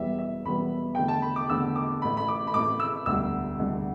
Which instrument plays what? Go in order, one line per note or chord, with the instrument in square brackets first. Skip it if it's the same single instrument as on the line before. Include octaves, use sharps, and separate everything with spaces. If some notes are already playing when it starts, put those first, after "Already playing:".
Already playing: [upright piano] E1 E2 E3 G3 B3 E5
E5
E1 E2 E3 G3 B3 B5
E2 D3 A3 G5
A5
B5
D6
E2 D3 A3 E6
D6
A1 A2 A3 B5
B5
D6
B5
A1 A2 A3 D6
E6
E1 D2 D3 G3 E6
E1 D2 D3 G3